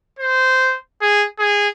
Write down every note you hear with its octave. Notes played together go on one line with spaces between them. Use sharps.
C5
G#4
G#4